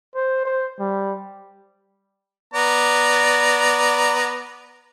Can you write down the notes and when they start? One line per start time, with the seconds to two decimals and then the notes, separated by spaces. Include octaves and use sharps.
0.16 C5
0.45 C5
0.80 G3
2.54 B3 D5 A#5